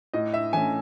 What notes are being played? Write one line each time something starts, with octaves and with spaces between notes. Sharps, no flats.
A2 D#5
E5
E3 A3 C#4 G#5